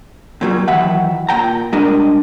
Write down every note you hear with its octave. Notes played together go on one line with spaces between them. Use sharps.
A#2 F#3 G3
D#3 E3 F#3 E5 F#5
A#2 G5 A#5
G3 G#3 D4 A#4 D#5